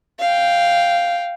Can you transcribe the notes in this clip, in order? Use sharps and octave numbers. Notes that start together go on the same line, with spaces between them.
F5 G5